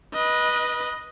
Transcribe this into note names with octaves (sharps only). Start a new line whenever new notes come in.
B4 D#5